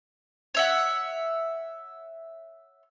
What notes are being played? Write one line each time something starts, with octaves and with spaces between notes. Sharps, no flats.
C#5 E5 F#5